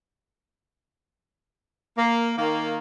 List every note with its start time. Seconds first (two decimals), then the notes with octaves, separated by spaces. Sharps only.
1.98 A#3
2.38 D#3 A#3